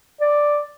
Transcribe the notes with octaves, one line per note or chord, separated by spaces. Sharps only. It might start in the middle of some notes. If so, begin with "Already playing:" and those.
D5